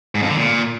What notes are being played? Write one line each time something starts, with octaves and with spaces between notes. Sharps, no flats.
G#2
F2
D3
A#2